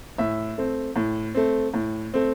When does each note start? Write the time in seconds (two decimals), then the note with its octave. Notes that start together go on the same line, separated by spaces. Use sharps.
0.18 A2 E5
0.58 A3 C4
0.96 A2
1.35 A3 C4
1.74 A2
2.14 A3 C4